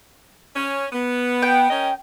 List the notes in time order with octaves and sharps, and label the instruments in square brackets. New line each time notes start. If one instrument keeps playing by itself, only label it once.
[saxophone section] C#4
B3
[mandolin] G5
[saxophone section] C#4 A#4 D#5